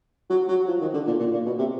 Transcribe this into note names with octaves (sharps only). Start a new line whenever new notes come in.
F#3
F#3
F3
D#3
D3
A#2
A#2
A#2
B2
C3